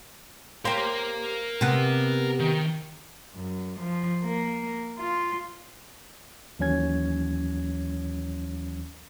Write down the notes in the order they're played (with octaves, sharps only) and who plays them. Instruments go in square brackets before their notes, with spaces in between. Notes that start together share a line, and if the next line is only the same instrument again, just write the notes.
[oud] G4 C5 [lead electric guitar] A#4 F5
[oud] C3 B3
[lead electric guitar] D#3
[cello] F#2
F3
A#3
F4
[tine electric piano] D#2 E3 F#3 C#4 G#6